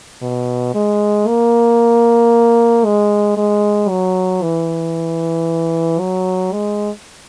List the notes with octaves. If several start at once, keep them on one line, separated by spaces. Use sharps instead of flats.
B2
G#3
A#3
G#3
G#3
F#3
E3
F#3
G#3